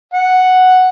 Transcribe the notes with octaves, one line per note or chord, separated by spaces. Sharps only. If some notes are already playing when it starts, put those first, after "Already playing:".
F#5